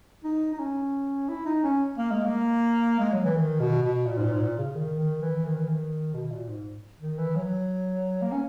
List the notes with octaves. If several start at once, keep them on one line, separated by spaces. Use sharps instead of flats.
D#4
D#4
C#4
E4
D#4
C#4
A#3
G#3
A#3
G#3
F#3
E3
D#3
B2
B2
A#2
G#2
A#2
G#2
A#2
C#3
D#3
D#3
E3
D#3
E3
D#3
B2
A#2
G#2
D#3
E3
F#3
A#3
C#4